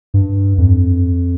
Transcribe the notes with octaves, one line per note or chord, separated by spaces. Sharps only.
G2
F2